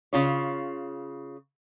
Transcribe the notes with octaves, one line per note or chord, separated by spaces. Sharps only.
C#3 F4 C#5